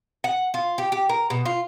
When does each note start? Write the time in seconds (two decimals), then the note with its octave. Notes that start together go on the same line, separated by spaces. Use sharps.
0.24 F#5
0.54 F4
0.78 G4
0.92 G4
1.09 A#4
1.30 B2
1.46 F4